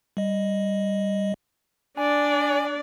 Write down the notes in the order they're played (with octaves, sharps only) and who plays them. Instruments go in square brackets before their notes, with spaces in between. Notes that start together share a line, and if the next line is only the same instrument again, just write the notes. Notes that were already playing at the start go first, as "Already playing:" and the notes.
[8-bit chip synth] G3 D#5
[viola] D4 D5 [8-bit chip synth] G#5